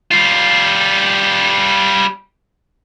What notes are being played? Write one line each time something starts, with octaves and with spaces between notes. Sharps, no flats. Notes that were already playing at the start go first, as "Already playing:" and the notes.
G3 F4